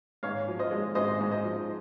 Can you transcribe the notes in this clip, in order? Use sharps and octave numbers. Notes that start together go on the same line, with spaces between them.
G#2 C#5 F5
F3
C5 D#5
G#3
G#2 C5 D#5
G#2
C5 D#5
F3